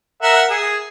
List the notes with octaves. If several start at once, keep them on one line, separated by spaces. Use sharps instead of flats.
A#4 E5 F#5
G#4